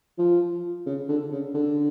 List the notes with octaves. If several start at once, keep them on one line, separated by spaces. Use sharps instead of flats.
F3
C#3
D3
C#3
D3